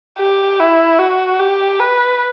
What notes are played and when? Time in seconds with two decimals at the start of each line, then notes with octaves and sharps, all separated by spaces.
0.18 G4
0.59 E4
0.98 F#4
1.39 G4
1.80 B4